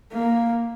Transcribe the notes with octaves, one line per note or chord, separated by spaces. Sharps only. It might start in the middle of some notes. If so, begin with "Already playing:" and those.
A#3